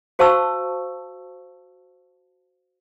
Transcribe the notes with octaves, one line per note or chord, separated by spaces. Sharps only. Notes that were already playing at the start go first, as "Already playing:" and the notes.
F#4 C5 F5 A5 C#6 E6